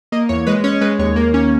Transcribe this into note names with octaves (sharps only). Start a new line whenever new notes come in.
A#3 D#5
E2 C#5
G#3 B4
C#4 C#5
G#3 B4
D#2 C#5
A#3
C#4